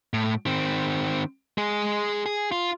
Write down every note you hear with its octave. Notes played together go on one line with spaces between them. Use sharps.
A2
D#3 C4
G#3 G#4
G#4
F4